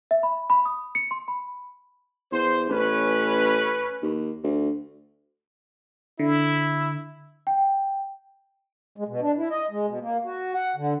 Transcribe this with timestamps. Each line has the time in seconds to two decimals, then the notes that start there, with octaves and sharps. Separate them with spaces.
0.11 E5
0.23 B5
0.50 B5
0.65 D#6
0.95 C#7
1.11 C6
1.28 B5
2.32 E2 C5
2.69 A1 C#4 B4
4.02 D#2
4.43 D2
6.19 D3 E4
7.47 G5
8.97 G#3
9.08 B2
9.22 D4
9.38 E4
9.51 D#5
9.71 G#3
9.87 B2
10.01 A#3
10.24 F#4
10.54 F#5
10.76 D3